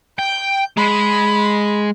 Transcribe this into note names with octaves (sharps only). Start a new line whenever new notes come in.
G5 G6
G#3 B5